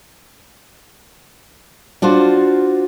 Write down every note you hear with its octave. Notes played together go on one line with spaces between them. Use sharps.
D4 F4 F#4 C5